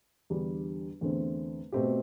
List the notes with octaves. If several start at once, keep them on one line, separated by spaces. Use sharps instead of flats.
E2 D3 G3 D4
E2 D3 A3 C4
B2 A3 C4 G4